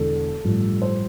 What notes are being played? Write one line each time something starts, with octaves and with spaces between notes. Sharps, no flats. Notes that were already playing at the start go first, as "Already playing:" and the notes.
Already playing: E1 E2 D3 A4
A1 G2 F3
C5